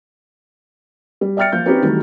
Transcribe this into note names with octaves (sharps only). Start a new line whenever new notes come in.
G3
D5 E5 G5 F6 A6 C#7
F3 A#3 G6
C4 C#4 D#4 G4 B4
D#3 E3 F#3 G3 A3